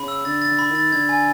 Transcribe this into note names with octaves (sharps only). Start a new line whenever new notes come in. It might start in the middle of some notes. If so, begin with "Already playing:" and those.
Already playing: C#3 B5
E6
D3 A6
A6
D3
B5
D#3 A6
D3 G#6
G#5